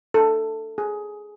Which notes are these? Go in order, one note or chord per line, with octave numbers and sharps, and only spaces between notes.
A4
G#4